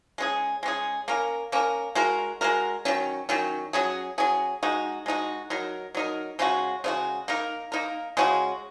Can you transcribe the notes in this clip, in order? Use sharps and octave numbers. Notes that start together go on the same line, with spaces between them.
G#3 C#4 G#4
G#3 C#4 G#4
A#3 C#4 A#4
A#3 C#4 A#4
G#3 F#4 A#4
G#3 F#4 A#4
D#3 F#3 C#4
D#3 F#3 C#4
F#3 C#4 G#4
F#3 C#4 G#4
G#3 D#4 F#4
G#3 D#4 F#4
F#3 D#4 A#4
F#3 D#4 A#4
C#3 G#3 C#4 F#4
C#3 G#3 C#4 F#4
A#3 D#4 A#4
A#3 D#4 A#4
C#3 G#3 C#4 F#4